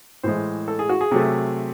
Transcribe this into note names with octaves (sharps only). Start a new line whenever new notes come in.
A2 E3 G#3 C5
A4
G#4
F#4
G#4
C3 F#3 A3